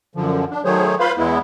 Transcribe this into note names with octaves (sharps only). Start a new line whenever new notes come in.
F#2 D3 F3
D4
D#3 F#3 A3 G#4 C5 C#5
F4 B4 C5 F5 B5 C6
E2 G#3 B3 E4